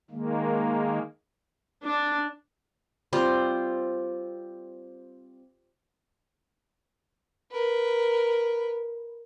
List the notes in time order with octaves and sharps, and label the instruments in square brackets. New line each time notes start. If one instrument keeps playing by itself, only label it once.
[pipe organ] D#3 G#3 A#3
[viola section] D4
[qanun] G3 C4 F4 C5
[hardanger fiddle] A#4 B4